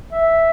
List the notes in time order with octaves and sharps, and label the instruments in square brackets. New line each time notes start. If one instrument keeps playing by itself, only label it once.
[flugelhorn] E5